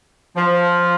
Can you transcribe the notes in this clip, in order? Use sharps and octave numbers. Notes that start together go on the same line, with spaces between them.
F3